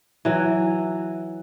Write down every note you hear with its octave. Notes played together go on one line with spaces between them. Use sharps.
E3 F#3